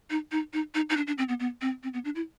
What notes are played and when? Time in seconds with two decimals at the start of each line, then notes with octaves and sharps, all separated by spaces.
0.10 D#4
0.32 D#4
0.53 D#4
0.75 D#4
0.90 D#4
0.97 D4
1.07 D4
1.18 C4
1.29 B3
1.40 B3
1.61 C4
1.83 C4
1.94 B3
2.05 D4
2.15 E4